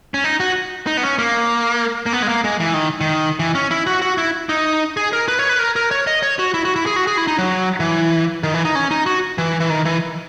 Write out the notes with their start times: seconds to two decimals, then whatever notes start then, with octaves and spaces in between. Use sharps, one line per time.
0.14 C#4
0.24 D#4
0.40 F#4
0.87 D#4
0.97 B3
1.03 C#4
1.19 A#3
2.06 A#3
2.13 B3
2.22 G#3
2.29 A#3
2.44 G#3
2.60 E3
2.74 D#3
3.01 D#3
3.39 E3
3.55 C#4
3.71 E4
3.87 F#4
4.02 F#4
4.18 E4
4.49 D#4
4.97 G#4
5.13 A#4
5.28 B4
5.39 C#5
5.49 B4
5.59 A#4
5.76 A#4
5.91 C#5
6.07 D#5
6.23 C#5
6.39 F#4
6.54 E4
6.65 F#4
6.76 E4
6.86 G#4
6.96 F#4
7.07 G#4
7.17 E4
7.27 D#4
7.38 F#3
7.80 E3
8.43 D#3
8.54 E3
8.65 D#4
8.75 C#4
8.91 D#4
9.06 F#4
9.38 E3
9.60 E3
9.70 D#3
9.85 E3